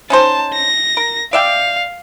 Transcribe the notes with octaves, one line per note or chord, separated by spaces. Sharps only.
C#4 D#4 C5 A5
A#6
A#4
D5 E5 F5 G5